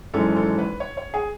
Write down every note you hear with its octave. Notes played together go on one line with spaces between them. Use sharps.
G#1 F#2 E3 G#3 C#4 A4
A4
B4
C#5
C#5
G#4